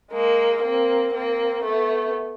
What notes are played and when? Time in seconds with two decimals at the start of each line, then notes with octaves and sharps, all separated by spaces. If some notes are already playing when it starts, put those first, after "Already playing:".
0.12 G#3 A#3
0.63 A#3 C4
1.14 A#3 C4
1.64 A3 B3